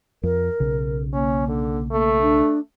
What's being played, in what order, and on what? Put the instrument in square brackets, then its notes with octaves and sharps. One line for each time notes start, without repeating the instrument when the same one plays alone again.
[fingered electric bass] F2 [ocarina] A#4
[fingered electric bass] B1 C#3
[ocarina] A#3 [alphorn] C#4
[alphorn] D3
[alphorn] A3 [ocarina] A#3
[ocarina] D4